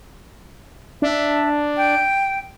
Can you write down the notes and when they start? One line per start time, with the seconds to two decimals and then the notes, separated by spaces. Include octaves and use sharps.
1.02 D4 E5
1.77 G5